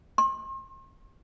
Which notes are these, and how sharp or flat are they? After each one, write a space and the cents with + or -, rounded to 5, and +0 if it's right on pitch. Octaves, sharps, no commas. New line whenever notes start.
C6 +40